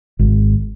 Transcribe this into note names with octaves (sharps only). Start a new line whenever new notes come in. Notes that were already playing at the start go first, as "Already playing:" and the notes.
G#1